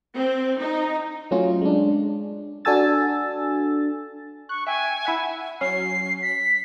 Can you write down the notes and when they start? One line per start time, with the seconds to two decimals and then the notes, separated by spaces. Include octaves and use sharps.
0.17 C4
0.62 D#4
1.31 F#3 A3 C#4 F4
1.61 G#3 D4
2.65 D4 F#4 A4 G#5 E6 A6
4.49 C#6 F#6
4.67 E5 G5 G#5
5.05 E4 E5 F#5
5.61 F#3 C#4 C7
6.22 B6